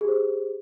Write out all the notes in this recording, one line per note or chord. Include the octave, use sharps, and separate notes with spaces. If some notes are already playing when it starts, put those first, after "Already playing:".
G4 G#4 C5